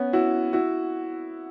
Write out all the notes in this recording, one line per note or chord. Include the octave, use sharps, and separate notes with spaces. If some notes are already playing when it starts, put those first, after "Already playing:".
Already playing: B3 C#4
E4 F#4
E4 F#4